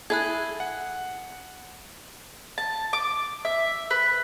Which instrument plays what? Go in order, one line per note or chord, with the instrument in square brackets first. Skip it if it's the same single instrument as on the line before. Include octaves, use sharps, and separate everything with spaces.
[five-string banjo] E4 A4 [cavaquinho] G#4 [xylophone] F#6 G#6
[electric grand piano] F#5
[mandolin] A5
D6
E5
B4